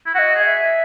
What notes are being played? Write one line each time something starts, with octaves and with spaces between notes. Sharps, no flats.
E4
F#4 D#5 F#5
G#4
E5